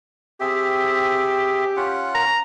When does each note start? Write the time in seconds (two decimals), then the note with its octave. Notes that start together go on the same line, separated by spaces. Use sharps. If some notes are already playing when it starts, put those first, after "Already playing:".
0.40 C4 G4 G#4 E5
1.77 C#4 F4 F#5
2.15 A#5